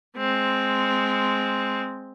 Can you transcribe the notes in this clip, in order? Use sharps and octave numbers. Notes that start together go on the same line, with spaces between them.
G#3 C4